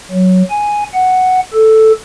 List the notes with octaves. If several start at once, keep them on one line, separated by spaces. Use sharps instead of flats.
F#3
G#5
F#5
A4